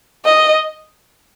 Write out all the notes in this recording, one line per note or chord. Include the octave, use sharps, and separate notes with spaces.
D#5